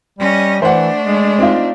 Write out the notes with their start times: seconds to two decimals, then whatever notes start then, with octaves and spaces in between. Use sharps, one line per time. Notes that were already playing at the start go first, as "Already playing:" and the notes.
0.19 G3 C#4 D#5
0.62 E3 A3 D4 C5 F#5
1.05 G#3
1.39 C4 D#4 F4